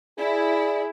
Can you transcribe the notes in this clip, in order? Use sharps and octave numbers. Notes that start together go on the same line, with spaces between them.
E4 G#4 D5